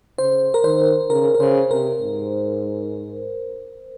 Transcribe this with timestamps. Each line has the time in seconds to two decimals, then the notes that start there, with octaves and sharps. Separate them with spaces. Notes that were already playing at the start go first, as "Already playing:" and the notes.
0.18 C#3 C5
0.54 A#4
0.64 D#3 C5
1.10 C#3 A#4
1.35 A#4
1.40 C#3 C5
1.71 C3 A#4
2.01 G#2